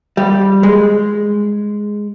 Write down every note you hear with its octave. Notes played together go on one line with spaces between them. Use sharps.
G3
G#3